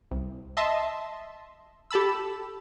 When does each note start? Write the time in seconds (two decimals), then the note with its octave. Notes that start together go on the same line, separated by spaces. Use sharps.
0.11 C2
0.57 D#5 E5 A5 C6
1.91 G4 A4 A5 B5 E6